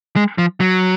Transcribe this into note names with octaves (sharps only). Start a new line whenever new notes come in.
G#3
F3
F#3